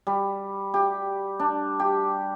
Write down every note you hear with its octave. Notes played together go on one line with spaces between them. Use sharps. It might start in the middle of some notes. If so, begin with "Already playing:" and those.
G3
G4
D4
G4